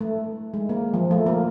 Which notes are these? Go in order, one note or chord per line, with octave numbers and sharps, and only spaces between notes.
A3
G#3
A#3
F3
A3
A#3